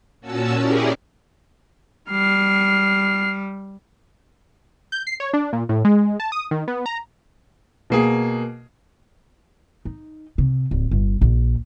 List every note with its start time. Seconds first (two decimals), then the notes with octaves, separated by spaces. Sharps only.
0.21 A#2 C#4 F#4 A5 E6
0.57 C#4 E4 G4 G#4 A#4 D5
2.11 G3 F6 C7
4.92 G6
5.07 C7
5.20 C#5
5.34 D4
5.53 A#2
5.69 A2
5.85 G#3
6.20 A5
6.32 D#6
6.51 D#3
6.68 B3
6.86 A#5
7.90 B2 A#3 G#4
9.85 D#4
10.38 C3
10.71 D1
10.91 G1
11.21 A#1